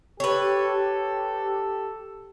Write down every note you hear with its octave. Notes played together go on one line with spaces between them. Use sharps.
G4 A4 B4 C#5